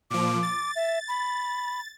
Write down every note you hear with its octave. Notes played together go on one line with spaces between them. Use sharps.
A#2 F3 D6
A6
E5
B5